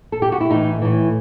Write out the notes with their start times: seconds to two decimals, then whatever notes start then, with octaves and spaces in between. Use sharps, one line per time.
0.12 A4
0.22 G4
0.32 F#4
0.41 E4
0.50 A2 E3 D#4
0.82 A2 E3